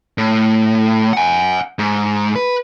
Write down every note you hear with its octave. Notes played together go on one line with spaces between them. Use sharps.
A2
F#5 G#5
G#2
B4